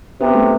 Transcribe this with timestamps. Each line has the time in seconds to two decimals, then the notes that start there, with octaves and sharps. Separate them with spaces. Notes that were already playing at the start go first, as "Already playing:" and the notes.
0.20 C3 B3
0.34 A3